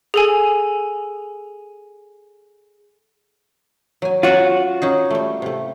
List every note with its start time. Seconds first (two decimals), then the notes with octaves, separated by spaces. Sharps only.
0.14 G#4 A4 G#5
4.02 F#3 G#5
4.23 F#3 C#4 F4 F#4
4.82 C#4 D#4 G#4
5.10 G3 A3
5.42 C3 A3